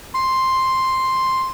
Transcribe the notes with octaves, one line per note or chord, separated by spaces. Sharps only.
C6